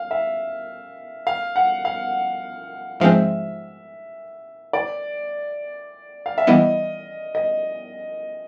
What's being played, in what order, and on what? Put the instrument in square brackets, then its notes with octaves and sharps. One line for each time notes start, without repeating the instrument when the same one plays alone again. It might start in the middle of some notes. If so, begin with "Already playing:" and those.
Already playing: [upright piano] F5
E5
F5
F#5
F5
[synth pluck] G#2 F3 G#3 C4 [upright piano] E5
[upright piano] D5
F5
E5
[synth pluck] E3 G3 B3 E4 [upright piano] D#5
[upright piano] D#5